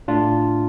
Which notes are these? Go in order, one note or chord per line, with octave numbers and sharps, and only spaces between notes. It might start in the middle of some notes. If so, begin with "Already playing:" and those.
A2 A3 D4 F4